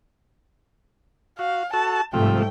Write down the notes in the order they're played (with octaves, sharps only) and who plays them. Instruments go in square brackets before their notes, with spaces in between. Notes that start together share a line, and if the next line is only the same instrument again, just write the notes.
[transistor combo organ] F#4 [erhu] F5
[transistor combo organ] F#4 A4 [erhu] A5
[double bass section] G#2 G3 A3 [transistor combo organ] C3 F3 [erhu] G5